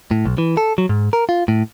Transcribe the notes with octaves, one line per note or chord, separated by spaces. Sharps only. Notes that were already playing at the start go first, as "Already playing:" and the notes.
A2
B1
E3
A4
F#3
G#2
A#4
F4
A2